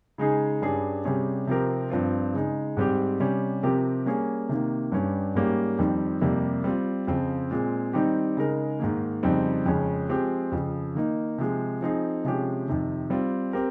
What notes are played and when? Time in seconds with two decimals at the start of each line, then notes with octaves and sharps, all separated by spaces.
0.18 C#3 G#3 D#4 G#4
0.62 G2 G3 C#4 G#4
1.04 C3 G3 C#4 G#4
1.47 C3 F3 C4 G4 A#4
1.90 G2 F3 C4 F4
2.33 C#3 G#3 D#4
2.77 G#2 G3 C4 G4
3.20 C3 G3 C#4
3.63 C3 F3 C4 G4 A#4
4.06 G3 A#3 C#4 G#4
4.49 C3 D#3 A#3
4.92 G2 G3 C#4
5.35 G#2 G3 A#3 C#4 G4
5.79 F2 D#3 G3 C4
6.21 F2 C3 G3 A#3
6.64 G3 C4 F4
7.07 F2 C#3 F3 C4 F4
7.51 A#2 G#3 C4
7.93 D#3 G3 C4 D#4 G4
8.37 C#3 G#3 D#4 A#4
8.80 G#2 D#3 A#3
9.23 F2 C#3 G3 C4 D#4
9.66 F2 C#3 G#3 C#4
10.09 F3 G#3 C4 G4
10.52 F2 C#3 F3
10.95 D#3 A#3 D#4
11.38 C3 F3 G#3
11.81 F3 C4 D#4 G#4
12.24 C3 F3 G#3 C#4 G4
12.68 F2 C3 D#3
13.10 G3 C4 F4
13.53 C4 G4 A#4